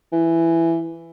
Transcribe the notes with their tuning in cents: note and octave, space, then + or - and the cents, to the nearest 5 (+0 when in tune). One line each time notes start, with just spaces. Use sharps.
E3 +10